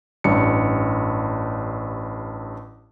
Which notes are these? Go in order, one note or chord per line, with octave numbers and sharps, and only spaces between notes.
A1 G2 C#7